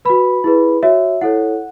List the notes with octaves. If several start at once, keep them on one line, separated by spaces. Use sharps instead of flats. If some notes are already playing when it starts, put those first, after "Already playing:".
F#4 B4 B5
E4 G#4 B4
F#4 C#5 E5
E4 A4 C#5 F#5